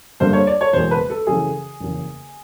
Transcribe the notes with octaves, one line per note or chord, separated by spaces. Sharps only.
G2 D3 G3 A#3 C5
C#5
D5
C#5
F#1 E2 B2 G#3 C5
B4
A4
F#2 C#3 E3 A3 G#4
F#1 E2 C#3